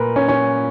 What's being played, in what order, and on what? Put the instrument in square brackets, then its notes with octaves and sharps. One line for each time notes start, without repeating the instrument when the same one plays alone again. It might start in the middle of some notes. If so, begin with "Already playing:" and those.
Already playing: [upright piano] A#2 A#4 B4
C#4
C#4